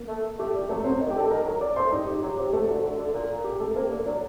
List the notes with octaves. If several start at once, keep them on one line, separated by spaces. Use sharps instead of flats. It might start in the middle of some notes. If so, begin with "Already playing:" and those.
Already playing: A#3
A3
A3 G4
G3
G4
F#3 A3 A4
F#3 C4 C5
D#3
G4 G5
D3
A4 A5
D#3 A#4 A#5
F#3
D5 D6
A3 C5 C6
G3 D#4 D#5
G4
F#3 G4
C3 G4
C3 A3 A4
D3 F#4
C3
D3
D3
A#2
G4
A3 A4
C3 A#3 A#4
D3
F#3 D4 D5